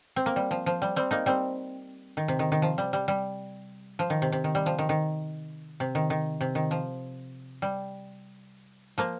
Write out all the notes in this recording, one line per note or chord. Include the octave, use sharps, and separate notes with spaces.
C4
A#3
G3
F3
F3
G3
G3 C4
A#3 D#4
G3 C4
D#3
C3
D#3
D#3
F3
G3
G3
G3
F3
D#3
C3
C3
D#3
G3
F3
D#3
D#3
C3
D#3
D#3
C3
D#3
F3
G3
F3 A#3